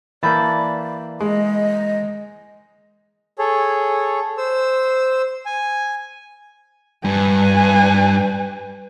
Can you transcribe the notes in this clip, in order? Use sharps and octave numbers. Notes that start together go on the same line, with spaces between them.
E3 A#3 D5 A5 B5 G6
G#3 D#5
G#4 A4 C#5
C5 E6
G#5
G2 B4 G#5